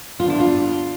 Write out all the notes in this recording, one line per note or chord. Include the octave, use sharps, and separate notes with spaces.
G2 D3 G3 B3 D4 F4
E4
F4